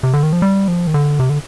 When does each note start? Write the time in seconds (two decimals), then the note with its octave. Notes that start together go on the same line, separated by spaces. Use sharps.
0.03 C3
0.13 D3
0.23 D#3
0.33 F3
0.42 G3
0.68 F3
0.87 D#3
0.94 D3
1.20 C3
1.30 D3